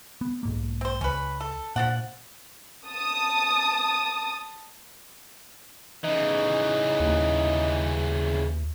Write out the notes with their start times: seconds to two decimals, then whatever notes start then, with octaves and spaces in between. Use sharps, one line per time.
0.21 B3
0.43 B1 G#2 A#3
0.81 C4 C5
1.01 C#2 C#4 B4
1.41 A4
1.76 A#2 F3 D4 F#5
2.87 A5 D#6
6.04 C#3 E3 D#4
7.00 D#2